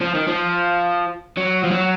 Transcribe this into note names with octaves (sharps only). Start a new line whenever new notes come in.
F3
D#3
F3
F#3
F3
F#3